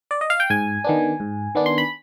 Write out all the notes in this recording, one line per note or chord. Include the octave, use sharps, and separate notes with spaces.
D5
D#5
F5
G5
G#2 G#5
D#3 B3 D4
G#2
D#3 B3 D4
C6
B5